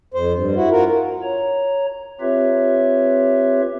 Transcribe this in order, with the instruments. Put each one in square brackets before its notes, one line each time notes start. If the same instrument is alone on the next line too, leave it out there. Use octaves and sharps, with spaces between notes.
[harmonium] F2 C5
G2
E4 F#4
F4 F#4 A#4
[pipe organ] C#5 A#5
C4 F4 G4 B4 C#5 E5